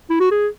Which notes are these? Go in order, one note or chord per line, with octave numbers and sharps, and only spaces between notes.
E4
F#4
G#4